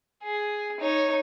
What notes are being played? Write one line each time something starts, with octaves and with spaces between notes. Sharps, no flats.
G#4
D#4 C#5